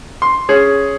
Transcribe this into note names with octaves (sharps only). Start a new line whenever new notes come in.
C6
C#4 G#4